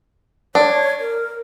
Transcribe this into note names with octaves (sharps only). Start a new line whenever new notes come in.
D4 C#5
A#4